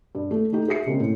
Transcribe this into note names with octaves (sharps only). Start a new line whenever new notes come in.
G2
A3
A3 D#4 G4
F#4 G#4 E5 C7 C#7
C#3 G#3 A#3 C4
A2